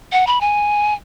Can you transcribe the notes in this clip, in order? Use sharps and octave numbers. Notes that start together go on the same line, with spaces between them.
F#5
B5
G#5